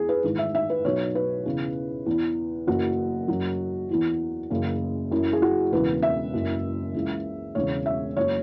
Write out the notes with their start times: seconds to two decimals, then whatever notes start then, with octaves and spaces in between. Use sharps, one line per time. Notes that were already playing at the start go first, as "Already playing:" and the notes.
Already playing: E2 E3 G#4
0.09 B4
0.24 G#1 G#2 E3
0.38 E5
0.55 E5
0.70 B4
0.84 B1 B2 F#3 C#5
1.15 B4
1.46 E2 C#3 E3
2.06 E2 E3
2.67 F#1 F#2 E3 F#4
3.28 F#1 F#2 F#3
3.89 E2 E3
4.51 F#1 F#2 C#3 E3
5.11 F#1 F#2 E3 E4
5.33 G#4
5.42 F#4
5.72 E1 E2 C#3 E3 B4
6.02 E5
6.34 F#1 F#2 E3
6.94 C#2 C#3 E3
7.55 E1 E2 C#3 C#5
7.86 E5
8.16 F#1 F#3 C#5